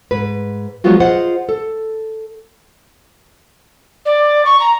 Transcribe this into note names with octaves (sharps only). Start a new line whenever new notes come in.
G#2 B4
F3 F#3 G#3 B3 F4 F#4
F4 G#4 C5 D#5 F#5
A4
D5
C#6
A#5